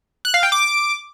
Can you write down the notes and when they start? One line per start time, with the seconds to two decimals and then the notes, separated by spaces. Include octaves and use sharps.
0.25 F#6
0.34 F5
0.43 G5
0.52 D6